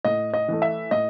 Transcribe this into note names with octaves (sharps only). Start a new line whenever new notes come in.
A2 D#5
D#5
E3 A3
E5
A2 D#5